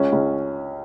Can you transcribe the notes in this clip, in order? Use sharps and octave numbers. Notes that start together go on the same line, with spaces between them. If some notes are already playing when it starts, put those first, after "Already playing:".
Already playing: C#2 C#4
C#2